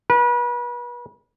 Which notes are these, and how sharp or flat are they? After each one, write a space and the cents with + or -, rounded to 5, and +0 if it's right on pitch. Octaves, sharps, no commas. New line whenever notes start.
B4 -35